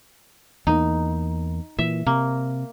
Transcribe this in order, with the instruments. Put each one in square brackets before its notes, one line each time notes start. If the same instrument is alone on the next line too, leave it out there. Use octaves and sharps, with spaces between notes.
[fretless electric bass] E2 A#3 [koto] D#4
[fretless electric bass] A#2 E3 [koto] E5
[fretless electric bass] C3 [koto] A#3